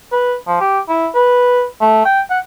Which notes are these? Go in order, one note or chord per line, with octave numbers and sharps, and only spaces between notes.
B4
F3
G4
E4
B4
A3
G5
F#5